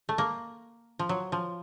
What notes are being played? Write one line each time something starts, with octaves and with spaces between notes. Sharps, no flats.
A3
A#3
F3
F#3
F3